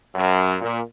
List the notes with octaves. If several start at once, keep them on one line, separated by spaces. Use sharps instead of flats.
F#2
A#2